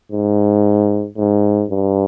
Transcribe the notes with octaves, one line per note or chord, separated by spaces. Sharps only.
G#2
G#2
G2